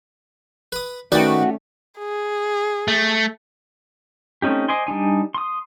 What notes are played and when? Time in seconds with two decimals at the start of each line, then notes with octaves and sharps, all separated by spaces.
0.72 B4 D#6
1.12 D#3 A3 C#4 D#4 F#4 B4 D5 G5
1.99 G#4
2.88 A3
4.42 A3 C4 C#4 D#4 G4
4.68 C5 D5 D#5 G#5 C6
4.87 G3 D4 D#4 G#5
5.35 C6 D#6